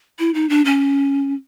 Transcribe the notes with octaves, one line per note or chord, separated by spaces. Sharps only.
E4
D#4
D4
C#4